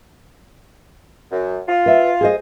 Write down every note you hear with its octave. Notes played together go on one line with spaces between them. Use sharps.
F#2
F4
B4 E5
G#4 C5 D#5